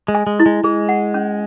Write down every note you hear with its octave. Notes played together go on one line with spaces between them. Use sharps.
G#3
G#5
G#3
E4
G#3
G#3 G#4
F#5
C#4